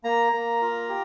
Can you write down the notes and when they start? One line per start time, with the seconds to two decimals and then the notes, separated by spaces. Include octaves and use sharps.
0.04 A#3 A#5
0.32 A#3
0.61 F4
0.89 G4